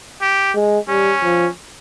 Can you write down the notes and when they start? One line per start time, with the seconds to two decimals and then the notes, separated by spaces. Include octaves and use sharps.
0.22 G4
0.55 G#3
0.89 G3 C#4
1.23 F3